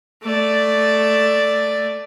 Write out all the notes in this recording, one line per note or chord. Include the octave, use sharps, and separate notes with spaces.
A3 D5